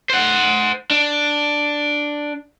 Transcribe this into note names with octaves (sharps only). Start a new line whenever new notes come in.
C5 F#5
D4